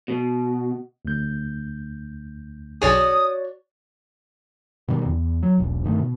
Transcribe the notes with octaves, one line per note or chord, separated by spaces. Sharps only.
B2
D2 G6
B1 F#4 G#4 C#5 D5 D#6
B2 D#3 G3
E2
F#3
E1 B1
G2 D#3 A3
B2